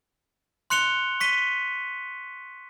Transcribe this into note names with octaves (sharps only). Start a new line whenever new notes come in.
C6 F#6 C#7 F7 G7
C#6 B6 D#7 G7